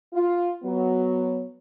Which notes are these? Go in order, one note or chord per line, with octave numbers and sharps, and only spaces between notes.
F4
F#3 B3